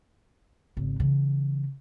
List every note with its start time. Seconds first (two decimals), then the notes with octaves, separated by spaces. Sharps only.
0.77 G#1 C#3
1.00 C#3 E3